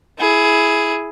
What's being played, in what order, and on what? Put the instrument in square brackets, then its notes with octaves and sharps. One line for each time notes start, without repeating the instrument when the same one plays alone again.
[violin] E4 G#4